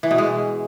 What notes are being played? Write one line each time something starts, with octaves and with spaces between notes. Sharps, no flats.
E3
B2
G#3